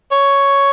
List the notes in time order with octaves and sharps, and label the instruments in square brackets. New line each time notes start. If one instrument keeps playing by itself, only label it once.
[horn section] C#5